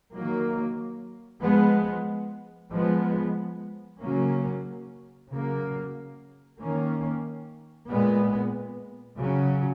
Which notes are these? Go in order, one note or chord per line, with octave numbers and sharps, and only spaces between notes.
D#3 F#3 A#3
F3 G#3 B3
F3 G#3 B3
C#3 F#3 A#3 C#4
C#3 F#3 A#3
D#3 A#3 C#4
A#2 G#3 B3
C#3 F#3 C#4